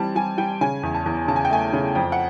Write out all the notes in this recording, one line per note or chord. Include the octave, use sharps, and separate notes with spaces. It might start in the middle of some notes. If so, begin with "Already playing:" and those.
Already playing: E3 G3 C4 A5
G3 G#5
G3 G5
C#3 G#5
E2
A5
E2
C#3 A5
G#5
G5
A3 G#5
C#3
F2 G5
F#5